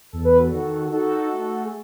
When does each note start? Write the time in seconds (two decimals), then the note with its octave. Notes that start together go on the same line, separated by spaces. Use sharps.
0.12 E2 A4
0.25 B4
0.37 F#4 A4
0.52 D#3
0.92 D#4 F#4 A4
1.33 A3
1.64 G#4